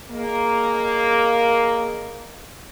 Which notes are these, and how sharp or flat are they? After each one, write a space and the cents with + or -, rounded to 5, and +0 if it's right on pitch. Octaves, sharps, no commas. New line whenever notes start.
A#3 +0 G#4 +0 D#5 -15